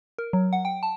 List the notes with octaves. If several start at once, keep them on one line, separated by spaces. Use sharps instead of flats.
A#4
F#3
F#5
G5
A5